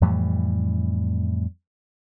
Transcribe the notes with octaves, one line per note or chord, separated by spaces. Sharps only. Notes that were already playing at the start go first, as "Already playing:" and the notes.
F2 A2 E3 G3